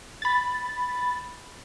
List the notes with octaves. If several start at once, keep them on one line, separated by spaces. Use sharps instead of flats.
B5 A6